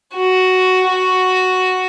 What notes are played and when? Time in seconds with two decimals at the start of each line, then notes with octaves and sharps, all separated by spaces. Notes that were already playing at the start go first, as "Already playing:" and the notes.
0.15 F#4
0.89 F#4